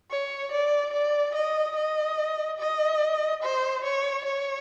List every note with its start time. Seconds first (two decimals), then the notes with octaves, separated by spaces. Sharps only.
0.11 C#5
0.52 D5
0.93 D5
1.35 D#5
1.76 D#5
2.59 D#5
3.43 C5
3.84 C#5
4.25 C#5